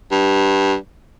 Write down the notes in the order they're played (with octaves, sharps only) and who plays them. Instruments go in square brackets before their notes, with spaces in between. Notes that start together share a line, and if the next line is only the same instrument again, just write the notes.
[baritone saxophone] G2